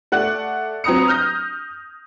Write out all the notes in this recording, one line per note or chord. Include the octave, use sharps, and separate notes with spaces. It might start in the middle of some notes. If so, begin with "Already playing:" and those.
A3 D5 F#5 F#6
F#3 C4 B4 A#5 D#6 C#7
D#6 F6 G6 A#6